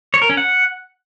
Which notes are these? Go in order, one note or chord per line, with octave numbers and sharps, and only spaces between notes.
C#5
A#4
C#4
F#5